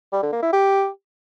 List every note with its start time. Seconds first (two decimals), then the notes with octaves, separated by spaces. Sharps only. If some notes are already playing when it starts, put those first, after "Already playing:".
0.12 G3
0.22 D3
0.33 A#3
0.43 E4
0.53 G4